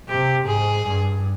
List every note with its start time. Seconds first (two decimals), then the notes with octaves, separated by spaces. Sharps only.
0.09 C3 G4
0.47 G#2 G#4
0.85 G2